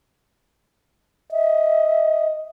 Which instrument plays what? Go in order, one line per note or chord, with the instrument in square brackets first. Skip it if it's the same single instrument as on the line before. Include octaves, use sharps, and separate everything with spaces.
[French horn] D#5 [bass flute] E5